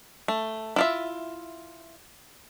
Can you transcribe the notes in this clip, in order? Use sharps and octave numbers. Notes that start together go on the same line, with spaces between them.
A3
E4 F4 E5